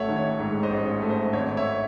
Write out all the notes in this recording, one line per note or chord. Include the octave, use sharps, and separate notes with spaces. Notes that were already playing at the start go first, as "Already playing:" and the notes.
Already playing: A1 A3 C#5 E5 F#5
D#3
C#5
G#2
C5 D#5
A1
A3
C5
G#1 C#5
C#5 E5